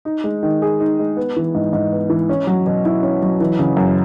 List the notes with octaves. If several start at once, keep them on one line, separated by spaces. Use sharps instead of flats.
D#4
G#3
D#3
G#4
D#4
G#3
B3
E3
G#2
G#2
B3
E3
C#4
F#3
B2
E4
C#4
F#3
E3
C#3
F#2